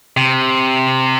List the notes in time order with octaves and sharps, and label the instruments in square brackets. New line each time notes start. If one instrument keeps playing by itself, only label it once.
[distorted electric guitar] C3